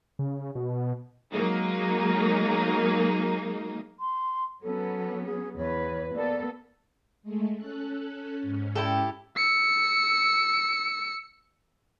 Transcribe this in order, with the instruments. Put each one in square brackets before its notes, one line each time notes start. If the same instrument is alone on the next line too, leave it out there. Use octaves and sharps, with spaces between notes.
[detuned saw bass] C#3
B2
[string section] F#3 G#3 A#3 D#4
[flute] C6
[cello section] F#3 B3 C#4 [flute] A4
[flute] G#4
[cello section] E2 B4 [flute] C#5
[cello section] A#3 B3 A4 [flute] D5
[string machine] G#3 A3
C#4 A4 F#6
G#2 C#4
[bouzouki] E4 G4 A4
[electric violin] E6 C#7